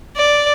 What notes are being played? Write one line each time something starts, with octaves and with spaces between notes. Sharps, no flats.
D5